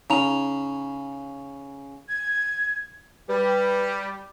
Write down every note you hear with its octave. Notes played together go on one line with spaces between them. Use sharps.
C#3 D#4 A#5 F7
G#6
G3 G4 B4